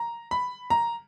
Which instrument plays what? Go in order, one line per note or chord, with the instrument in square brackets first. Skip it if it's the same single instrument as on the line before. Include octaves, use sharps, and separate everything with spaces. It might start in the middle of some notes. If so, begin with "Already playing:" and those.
Already playing: [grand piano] A#5
B5
A#5